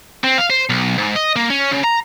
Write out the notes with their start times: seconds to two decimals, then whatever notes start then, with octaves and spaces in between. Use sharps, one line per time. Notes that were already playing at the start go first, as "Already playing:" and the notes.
0.24 C4
0.38 F5
0.50 C5
0.70 B1
0.98 G#2
1.16 D#5
1.36 A#3
1.50 C#4
1.71 C#3
1.84 A#5